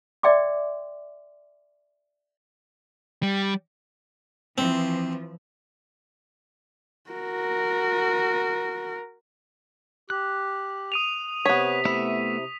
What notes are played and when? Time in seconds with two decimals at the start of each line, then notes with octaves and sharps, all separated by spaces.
0.23 D5 E5 G5 C6 D6
3.23 G3
4.58 E3 F3 C4
7.10 F#4 A#4
10.10 G4 F#6
10.92 D#6 D#7 F7
11.45 C3 B3 C#5 B6
11.85 A3 B3 E4 E5